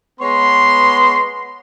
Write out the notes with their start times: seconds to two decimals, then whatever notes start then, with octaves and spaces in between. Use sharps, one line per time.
0.20 G#3 B3 C#5 C6